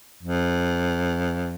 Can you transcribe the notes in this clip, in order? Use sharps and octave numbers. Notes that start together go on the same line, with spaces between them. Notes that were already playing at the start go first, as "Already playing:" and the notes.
F2